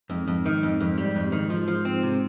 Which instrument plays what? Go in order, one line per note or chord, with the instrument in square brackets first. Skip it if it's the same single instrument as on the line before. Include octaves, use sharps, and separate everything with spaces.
[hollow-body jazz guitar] F2 [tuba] G#2
[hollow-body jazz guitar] F2
D#3
F2
F2
G3
F2
D#3
F3
F3
C4
C3